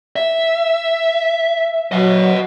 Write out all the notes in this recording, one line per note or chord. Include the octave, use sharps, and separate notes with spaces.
E5
F#3 D#5 F#5